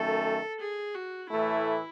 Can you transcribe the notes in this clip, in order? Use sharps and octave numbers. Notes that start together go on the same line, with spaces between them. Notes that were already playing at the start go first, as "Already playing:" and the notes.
Already playing: F#2 D#3 A3 A4
G#4
F#4
A2 E3 A3 E4